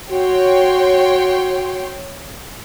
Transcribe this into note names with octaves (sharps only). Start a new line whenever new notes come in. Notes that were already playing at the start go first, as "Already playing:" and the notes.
F#4 C#5 G5 C6